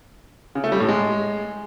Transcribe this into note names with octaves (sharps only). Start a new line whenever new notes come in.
C#3
A3
G3
A2
G#3